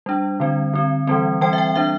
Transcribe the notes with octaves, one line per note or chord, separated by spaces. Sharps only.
G3 D4
D3 G3 C4
D3 C4
E3 G3 C4
E3 G3 C4 G5
E5
G5
G3 D4 E5